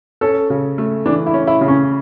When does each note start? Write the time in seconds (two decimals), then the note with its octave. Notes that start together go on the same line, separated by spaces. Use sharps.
0.21 C#4 A4
0.50 C#3
0.78 A3
1.06 E3 D4
1.26 E4
1.34 C#4
1.47 E4
1.61 C#3
1.68 C#4